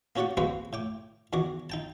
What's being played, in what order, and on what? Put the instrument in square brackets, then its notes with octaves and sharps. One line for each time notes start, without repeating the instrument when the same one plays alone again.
[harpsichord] A#3 C#4 F#4 G4 D5 F#5
G#3 A#3 C4 F#4 B4 C5
A2 G5 D6
E2 D#3 F#4 D6
D#4 G5 A5